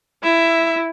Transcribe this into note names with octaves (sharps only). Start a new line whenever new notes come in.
E4 E5